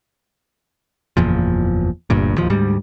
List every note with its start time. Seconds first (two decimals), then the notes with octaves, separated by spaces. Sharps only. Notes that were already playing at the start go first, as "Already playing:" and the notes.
1.17 F#1 E2 A#2 F3
2.10 G1 D2 G2 A#2
2.36 D1 D#2 F3
2.50 D2 G#2 G3